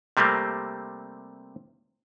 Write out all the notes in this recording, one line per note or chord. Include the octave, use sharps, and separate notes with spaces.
C3 G3 A3 A#3 C4